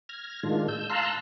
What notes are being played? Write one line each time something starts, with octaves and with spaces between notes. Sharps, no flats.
F6 G#6 A#6
A2 D#3 G#3 D4 F4
E6 G6
F5 A5 A#5 C6 E6 F#6